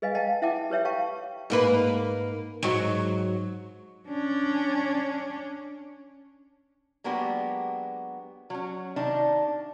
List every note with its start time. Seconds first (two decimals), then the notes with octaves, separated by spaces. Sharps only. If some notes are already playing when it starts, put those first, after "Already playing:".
0.02 G#4 B4 D#5 F5 G#5
0.15 D#5 F5 G5 A5
0.42 E4 E5 F#5 G5 A5 D6
0.70 G4 B4 C#5 E5 G5
0.85 G4 F5 G5 A5 C#6
1.50 G#2 A#3 B4
2.63 G#2 F#3
4.09 C#4 D4
7.04 F#3 G#3 A#3 B3 D4 G4
8.50 F#3 C#4
8.96 C3 D#3 D4 D#4